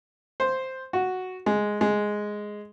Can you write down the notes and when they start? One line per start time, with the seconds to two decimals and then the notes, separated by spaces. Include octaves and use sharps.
0.40 C5
0.93 F#4
1.46 G#3
1.81 G#3